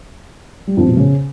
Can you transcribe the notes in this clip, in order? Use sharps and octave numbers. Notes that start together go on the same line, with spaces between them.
G3
F2
B2
C#3